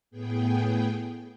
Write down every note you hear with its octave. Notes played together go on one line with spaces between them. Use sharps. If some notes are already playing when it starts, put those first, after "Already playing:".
A2 B3 G#4 G5